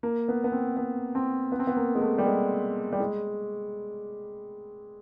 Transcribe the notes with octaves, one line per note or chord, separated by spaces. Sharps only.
A#3
B3
B3
C4
B3
C4
B3
C4
B3
A#3
G#3
A3
G3
G#3
G3
G#3